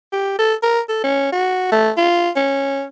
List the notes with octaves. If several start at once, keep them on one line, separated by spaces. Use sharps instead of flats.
G4
A4
A#4
A4
C#4
F#4
A3
F4
C#4